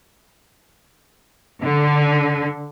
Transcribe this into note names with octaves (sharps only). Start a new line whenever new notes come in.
D3